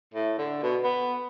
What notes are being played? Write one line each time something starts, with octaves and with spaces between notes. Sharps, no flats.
A2
D3
B2
B3